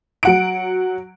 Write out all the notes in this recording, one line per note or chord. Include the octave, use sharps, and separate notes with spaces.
F#3 F#5 D7